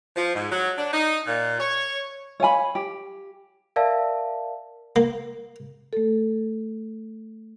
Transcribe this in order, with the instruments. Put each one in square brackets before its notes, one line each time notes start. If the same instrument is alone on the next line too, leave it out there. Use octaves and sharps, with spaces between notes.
[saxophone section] F3
G#2
F#3
D4
D#4
A#2
C#5
[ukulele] C#5 F5 G#5 B5
G4
[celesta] A#4 D5 E5 F5 A5
[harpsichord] A#3
[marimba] A3 A4